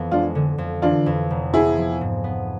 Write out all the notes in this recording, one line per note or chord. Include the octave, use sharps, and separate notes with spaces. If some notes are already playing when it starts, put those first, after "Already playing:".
Already playing: F2 E3 B3
G#3 D4 F4
D3
F2
E3 D4 F4
F2
F1
B3 E4 G#4
F3
G#2
B3